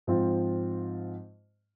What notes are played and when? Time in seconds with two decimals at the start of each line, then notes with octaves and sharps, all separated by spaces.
0.07 G#2 F3 C4 F4